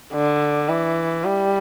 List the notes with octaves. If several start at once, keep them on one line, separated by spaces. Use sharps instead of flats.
D3
E3
G3